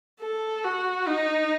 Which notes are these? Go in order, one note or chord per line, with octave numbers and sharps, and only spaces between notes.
A4
F#4
D#4